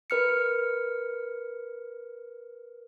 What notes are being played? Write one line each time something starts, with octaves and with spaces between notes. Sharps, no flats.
A#4 B4 F6 C#7